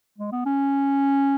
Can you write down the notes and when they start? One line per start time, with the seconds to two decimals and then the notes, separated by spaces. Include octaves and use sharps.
0.18 G#3
0.32 B3
0.46 C#4